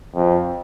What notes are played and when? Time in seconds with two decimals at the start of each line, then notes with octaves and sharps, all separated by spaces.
0.15 F2